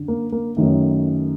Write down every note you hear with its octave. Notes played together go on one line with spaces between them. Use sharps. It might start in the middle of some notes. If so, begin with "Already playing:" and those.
Already playing: F#2 D3
A#3
A#3
F#2 D#3 A3